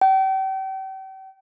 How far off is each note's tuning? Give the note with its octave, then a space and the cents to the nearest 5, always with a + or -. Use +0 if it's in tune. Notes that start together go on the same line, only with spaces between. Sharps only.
G5 -40